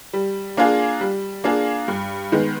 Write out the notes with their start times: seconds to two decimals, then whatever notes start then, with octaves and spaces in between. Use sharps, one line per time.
0.13 G3
0.57 A#3 D4 F4 G#4
1.01 G3
1.44 A#3 D4 F4 G#4
1.88 G2
2.32 D#3 G#3 B3